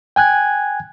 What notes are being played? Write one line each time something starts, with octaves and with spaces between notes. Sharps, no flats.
G5 G#5 F#6 G#6